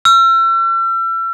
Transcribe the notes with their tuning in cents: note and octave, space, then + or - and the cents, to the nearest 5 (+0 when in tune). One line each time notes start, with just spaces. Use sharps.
E6 +40